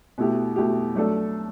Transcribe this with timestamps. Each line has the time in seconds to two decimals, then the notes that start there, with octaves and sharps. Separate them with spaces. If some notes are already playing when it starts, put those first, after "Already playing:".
0.18 B2 A3 E4 G4
0.56 B2 A3 E4 G4
0.95 F#3 A3 D4 A4